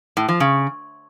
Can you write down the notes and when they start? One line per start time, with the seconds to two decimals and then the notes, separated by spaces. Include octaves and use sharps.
0.17 A2
0.29 F3
0.40 C#3